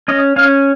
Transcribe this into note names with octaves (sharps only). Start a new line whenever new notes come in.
C#4 D#5
C#4 F5